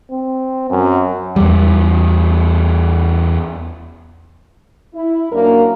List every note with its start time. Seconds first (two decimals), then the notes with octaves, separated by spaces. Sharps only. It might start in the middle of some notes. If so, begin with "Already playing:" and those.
0.11 C4
0.70 F#2
1.36 E2 G3
4.95 E4
5.32 F#2 A#3 D4 A#4